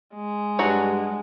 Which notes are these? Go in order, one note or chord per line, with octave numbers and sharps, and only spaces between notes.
G#3
G2 F#3 D4 F#4